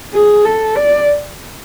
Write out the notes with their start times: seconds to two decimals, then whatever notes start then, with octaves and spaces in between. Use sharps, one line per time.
0.13 G#4
0.45 A4
0.76 D5